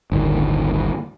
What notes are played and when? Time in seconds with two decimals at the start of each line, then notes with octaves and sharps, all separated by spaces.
0.12 G1 D2 A2 D#3